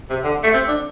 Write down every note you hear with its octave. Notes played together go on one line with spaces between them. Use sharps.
C3
D3
A3
C4
D4